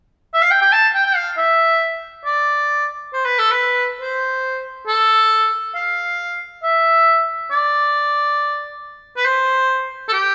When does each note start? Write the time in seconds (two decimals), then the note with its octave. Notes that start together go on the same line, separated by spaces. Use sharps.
0.34 E5
0.42 F5
0.51 G5
0.61 G5
0.73 A5
0.95 G5
1.06 G5
1.16 F5
1.38 E5
2.25 D5
3.14 C5
3.25 B4
3.39 A4
3.51 B4
4.01 C5
4.88 A4
5.75 F5
6.63 E5
7.51 D5
9.17 B4
9.25 C5
10.09 A4
10.13 G4